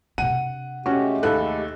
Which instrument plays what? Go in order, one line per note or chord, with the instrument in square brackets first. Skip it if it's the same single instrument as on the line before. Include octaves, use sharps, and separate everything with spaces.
[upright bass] C3 D4 [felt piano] F#5 [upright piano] D#7
[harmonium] G#3 A3 G4 [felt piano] C#4 F#4
[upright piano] D#2 B5 F#6 [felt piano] A4